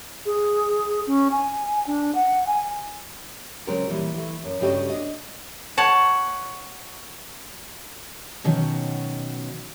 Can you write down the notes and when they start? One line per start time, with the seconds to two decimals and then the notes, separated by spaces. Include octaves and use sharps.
0.26 G#4
1.07 C#4
1.32 G#5
1.87 D4
2.15 F#5
2.47 G#5
3.67 C#3 F#3 G#3 C4 C#4 A#4
3.88 A#2 E3 G3
4.14 E3 A3
4.44 F#2
4.60 G2 C#3 A3 F#4 G4 D#5
4.90 D4 D#5
5.77 C#5 F#5 A5
8.44 B2 D#3 F#3 C#4